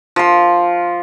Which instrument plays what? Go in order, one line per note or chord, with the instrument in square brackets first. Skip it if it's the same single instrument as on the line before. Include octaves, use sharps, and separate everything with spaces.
[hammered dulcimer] F3 C6